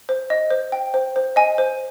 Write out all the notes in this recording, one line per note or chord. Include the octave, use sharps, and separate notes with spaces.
C5
D#5
C5
G5
C5
C5
D#5 G#5
C5